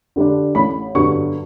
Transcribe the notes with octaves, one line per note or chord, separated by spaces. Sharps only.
D3 G3 D4
A1 B5
G2 D3 F#3 B3 C#6